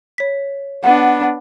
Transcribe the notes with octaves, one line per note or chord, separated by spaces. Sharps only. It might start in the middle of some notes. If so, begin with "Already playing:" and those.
C#5 B6
B3 D4 F#5